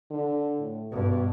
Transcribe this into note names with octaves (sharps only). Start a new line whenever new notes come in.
D3
A2
G2 B2